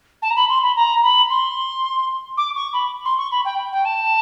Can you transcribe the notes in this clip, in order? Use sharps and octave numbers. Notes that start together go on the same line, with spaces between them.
A5
A#5
B5
C6
B5
A#5
B5
C6
D6
C#6
B5
C6
C#6
B5
G5
G5
A5